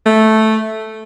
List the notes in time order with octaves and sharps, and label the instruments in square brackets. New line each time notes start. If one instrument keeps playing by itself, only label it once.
[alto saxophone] A3